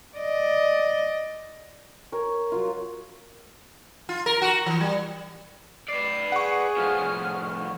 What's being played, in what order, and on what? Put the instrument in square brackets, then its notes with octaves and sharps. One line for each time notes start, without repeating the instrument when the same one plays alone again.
[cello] D5 D#5
[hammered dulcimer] A#4 C#5
F#3 F4
[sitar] F4
A#4
F#4
E3
G3
[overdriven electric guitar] B4 D5 [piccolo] C7
[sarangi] G#4 [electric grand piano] F#5 C#6
[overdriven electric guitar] A2 F3 [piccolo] F6